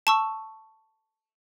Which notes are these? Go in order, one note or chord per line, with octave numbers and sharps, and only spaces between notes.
A5 C#6 E6